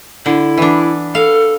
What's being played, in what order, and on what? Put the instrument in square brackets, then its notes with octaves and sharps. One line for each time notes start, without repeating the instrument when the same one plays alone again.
[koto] D3 [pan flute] E4
[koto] E3 B3 D4
[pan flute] A4 [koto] F5